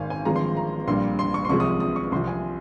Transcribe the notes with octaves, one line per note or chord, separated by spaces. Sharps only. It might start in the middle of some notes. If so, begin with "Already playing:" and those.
Already playing: G#1 G#2 D#3 F5 G#5
G#5
G#1 G2 F3 G#3 A#5
C6
A#5
A#1 A#2 G3 C6
C6
C#6
C6
C2 C3 F3 G#3 C#6
D#6
D#6
C#6
C2 C3 F3 C6
G#5